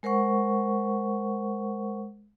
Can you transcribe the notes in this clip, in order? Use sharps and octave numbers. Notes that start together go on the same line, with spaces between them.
G#3 A#4 C5 F#5 C#6